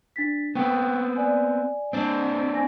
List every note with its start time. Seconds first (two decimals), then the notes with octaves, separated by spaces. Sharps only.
0.16 D4 A6 B6
0.55 B3 C4 G5 C#6
1.16 D5 G#5
1.93 C4 D4
2.54 G#5 A#6